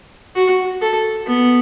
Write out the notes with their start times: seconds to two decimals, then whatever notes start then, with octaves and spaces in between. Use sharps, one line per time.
0.36 F#4
0.82 A4
1.27 B3